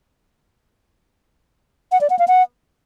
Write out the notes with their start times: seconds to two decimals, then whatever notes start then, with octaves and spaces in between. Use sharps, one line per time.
1.92 F#5
2.01 D5
2.10 F#5
2.19 F5
2.28 F#5